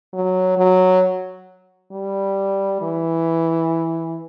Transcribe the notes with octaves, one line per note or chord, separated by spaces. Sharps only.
F#3
F#3
G3
E3